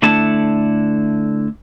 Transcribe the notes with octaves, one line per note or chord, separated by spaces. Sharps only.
D3 A3 D4 E4 A5